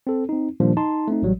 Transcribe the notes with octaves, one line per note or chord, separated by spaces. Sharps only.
C4 A4
C4 D#4
A#2 D#3 F3 G3 A#3 D4
D#4 A5 C6
A3 C4 D#4
A1 F#3 G3